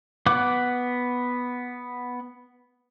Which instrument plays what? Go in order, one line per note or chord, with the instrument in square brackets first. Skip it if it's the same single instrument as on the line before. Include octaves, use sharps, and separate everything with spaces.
[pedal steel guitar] B3 F#5 D6 F#6